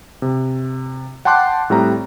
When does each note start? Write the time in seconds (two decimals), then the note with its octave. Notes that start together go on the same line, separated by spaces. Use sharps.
0.22 C3
1.25 F#5 G5 A5 C6 D6 F#6
1.70 A2 G3 C4 A#5